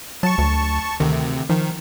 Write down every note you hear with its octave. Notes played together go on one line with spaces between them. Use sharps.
F#3 A5 C#6
D2
D2 C3 D#3
D#3 F3